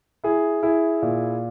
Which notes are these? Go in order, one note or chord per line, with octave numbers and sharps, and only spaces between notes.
E4 G#4
E4 G#4
A#2